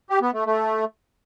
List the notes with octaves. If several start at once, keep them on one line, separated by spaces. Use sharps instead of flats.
G4
B3
A3
A3